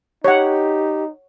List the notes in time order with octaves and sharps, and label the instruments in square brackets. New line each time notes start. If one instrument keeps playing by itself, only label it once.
[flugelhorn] D#4 [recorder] G4 [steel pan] C#5 F#5